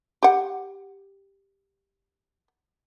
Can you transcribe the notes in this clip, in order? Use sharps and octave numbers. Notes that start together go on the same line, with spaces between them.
G4 F#5